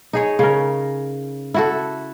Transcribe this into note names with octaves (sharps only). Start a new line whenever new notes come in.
D#4 G#4 C#5
C#3 A#4
E4 F#4 A4